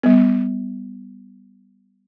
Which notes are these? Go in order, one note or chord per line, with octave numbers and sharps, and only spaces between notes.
G3 B3